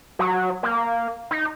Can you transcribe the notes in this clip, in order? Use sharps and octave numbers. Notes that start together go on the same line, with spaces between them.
F#3
A#3
D#4